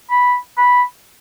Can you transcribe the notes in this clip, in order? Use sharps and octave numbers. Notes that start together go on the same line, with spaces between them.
B5
B5